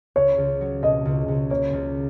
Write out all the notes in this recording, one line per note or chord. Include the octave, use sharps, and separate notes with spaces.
C#2 C#5
C#2
F#3
B2 D#5
C#2
C#2
A#3 C#5
C#2